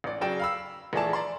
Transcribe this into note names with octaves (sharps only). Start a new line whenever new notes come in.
A1 D5
C#3 F#3 D5 G5 E7
F5 B5 E6
A#1 E3 A3 G#4 D5 A5
D5 A#5 C6